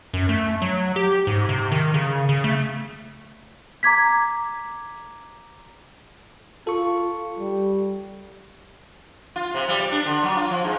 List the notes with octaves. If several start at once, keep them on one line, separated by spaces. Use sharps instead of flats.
F#2
A3
F#3
G4
G#2
C3
D#3
C#3
C#3
A3
A#5 D6 G#6 B6
F4 A4 C#6
G3
F4
C3
G3
D5
D4
D3
F#3
F4
F3
G#2